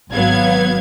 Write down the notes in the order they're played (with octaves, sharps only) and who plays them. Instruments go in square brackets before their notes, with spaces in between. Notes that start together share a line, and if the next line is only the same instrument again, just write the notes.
[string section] G#1 F#3 B3 F5 G#6